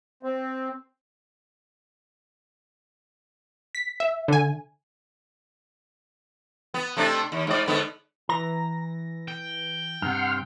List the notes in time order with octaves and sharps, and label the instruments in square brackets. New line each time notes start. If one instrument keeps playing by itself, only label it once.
[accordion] C4
[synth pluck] B6
E5
D3 G#5
[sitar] B3
C3 A3 D4
D#2
G#2 D5
G#2 D3 B3
[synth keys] E3 A#6 [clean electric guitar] A#5
[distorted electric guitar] G5
[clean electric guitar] G2 C3 [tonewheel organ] F#5 C6 F6